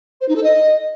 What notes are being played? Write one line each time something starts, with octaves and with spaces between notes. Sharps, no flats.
C5
D#4
A4
D#5